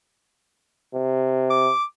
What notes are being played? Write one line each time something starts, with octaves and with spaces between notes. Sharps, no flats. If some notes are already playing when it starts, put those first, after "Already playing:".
C3
D6